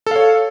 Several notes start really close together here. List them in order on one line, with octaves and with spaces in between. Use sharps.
A4 F5 C#5